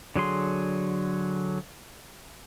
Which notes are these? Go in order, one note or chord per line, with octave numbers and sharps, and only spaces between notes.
D3 F#3 G#4 C6